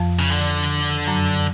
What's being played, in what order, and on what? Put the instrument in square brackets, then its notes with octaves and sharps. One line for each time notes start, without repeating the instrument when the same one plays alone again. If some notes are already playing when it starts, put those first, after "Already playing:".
Already playing: [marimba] F2 F3
[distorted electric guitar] C#3
D3
[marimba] F#2 F#3